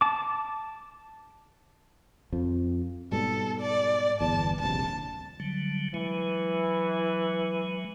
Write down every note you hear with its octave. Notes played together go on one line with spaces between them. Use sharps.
A5 D6
F2 F3
G#2 B2 G3 A4
D5
G1 E2 A5
D#1 A#1 C3 A5
D3 F#3 G3
E3 F#3 G#3